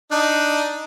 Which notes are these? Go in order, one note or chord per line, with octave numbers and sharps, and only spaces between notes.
D4 D#4